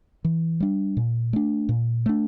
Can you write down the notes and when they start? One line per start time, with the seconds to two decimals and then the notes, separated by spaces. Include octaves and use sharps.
0.24 E3
0.60 G3 D4
0.97 A#2
1.33 A3 D4
1.69 A#2
2.06 A3 D4